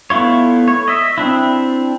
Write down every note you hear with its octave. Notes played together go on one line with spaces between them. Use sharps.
A3 B3 E4 F4 C#5
C#5
D#5 E5
C4 D4 E4